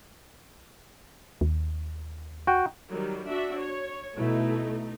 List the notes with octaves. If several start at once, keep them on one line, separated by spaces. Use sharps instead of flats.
D#2
F#4 G5
D#3 F#3 G3
D4 F#4 E5
C#5
B2 A3 D#4 E4